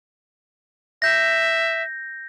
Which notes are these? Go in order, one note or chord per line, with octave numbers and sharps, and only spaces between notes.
E5 G6 A#6